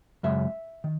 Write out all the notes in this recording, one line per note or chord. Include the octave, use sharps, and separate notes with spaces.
F#2 C#3 G#3 E5
D#3